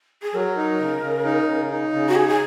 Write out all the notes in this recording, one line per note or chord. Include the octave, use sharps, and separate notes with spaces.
G#4
F#3 A#4
D#4
C#3
C#3
D#4
C#3
D#4
C#3
F#4
D#4 G#4
G#4